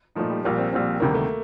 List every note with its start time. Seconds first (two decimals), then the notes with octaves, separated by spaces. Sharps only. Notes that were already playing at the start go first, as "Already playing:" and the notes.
0.15 A#2 F3 A3 D#4
0.30 G3
0.44 A#1 A#2 G3 A#3
0.58 C4
0.72 A#1 A#2 G3 C4
1.00 D2 C3 D#3 G3 A#3
1.14 A3